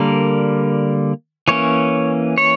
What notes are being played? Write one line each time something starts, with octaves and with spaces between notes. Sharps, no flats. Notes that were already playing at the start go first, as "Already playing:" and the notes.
Already playing: D3 G3 A#3 A#4
E3 A#3 C#4 C#5
C#5